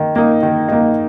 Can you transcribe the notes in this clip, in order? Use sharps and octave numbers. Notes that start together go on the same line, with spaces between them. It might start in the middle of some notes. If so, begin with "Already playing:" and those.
Already playing: D#3 A#3 D#4
A#3 D#4
D#3
A#3 D#4